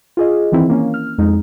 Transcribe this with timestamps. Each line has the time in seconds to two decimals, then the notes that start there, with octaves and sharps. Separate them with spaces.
0.17 F4 G#4 D#5
0.52 D#3 E3 C4 E4
0.69 A#3 C#4
0.94 F6
1.18 F2 G#3 D#4